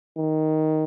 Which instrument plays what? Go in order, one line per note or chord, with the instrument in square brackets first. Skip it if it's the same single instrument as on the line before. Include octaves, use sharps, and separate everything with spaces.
[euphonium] D#3